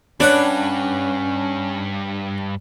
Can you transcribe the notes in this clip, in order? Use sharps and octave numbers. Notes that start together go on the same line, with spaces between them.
G2 C#4 D4 B4 C#5 F#5